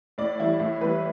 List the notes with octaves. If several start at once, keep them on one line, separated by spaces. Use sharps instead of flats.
A2 D5
E3 G3 E4
A2 E4
E3 G3 B4